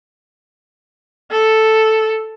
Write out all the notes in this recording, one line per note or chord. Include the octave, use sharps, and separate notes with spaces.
A4